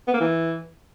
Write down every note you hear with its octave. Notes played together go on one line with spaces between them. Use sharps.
B3
A#3
E3